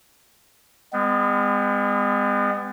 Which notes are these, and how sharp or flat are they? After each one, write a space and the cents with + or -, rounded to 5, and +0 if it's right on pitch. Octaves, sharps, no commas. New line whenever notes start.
G#3 -40 B3 +35